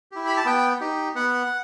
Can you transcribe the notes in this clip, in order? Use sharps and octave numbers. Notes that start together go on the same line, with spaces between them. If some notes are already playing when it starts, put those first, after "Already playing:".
E4 G4
B5
A5
B3 G5
D#4 G4
B3 F#5